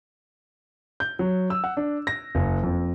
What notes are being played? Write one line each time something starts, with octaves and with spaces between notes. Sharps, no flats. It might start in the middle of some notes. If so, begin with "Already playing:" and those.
G6
F#3
E6
F#5
D4
A#6
F#1
F2